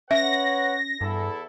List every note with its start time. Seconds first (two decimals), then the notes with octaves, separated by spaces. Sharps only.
0.11 C#4 B4 C#5 E5 F#5 A#6
1.01 E2 G2 E4 A4